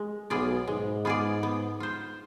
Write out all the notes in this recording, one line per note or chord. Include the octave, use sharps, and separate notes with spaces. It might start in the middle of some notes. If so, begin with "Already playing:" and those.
Already playing: G#3
B1 B2 B3 F4 G#4 D5
G#2 G#3
B3 F4 G#4 D5
B3
F4 C5